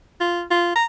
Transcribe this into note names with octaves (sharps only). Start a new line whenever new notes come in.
F4
F4
A#5